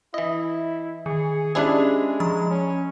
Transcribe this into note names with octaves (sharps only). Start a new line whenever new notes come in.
E3 E4 D#5
D#3 G#4 C#7
G#3 C#4 D4 E4 G4 G#4 C5
F3 B5
C#4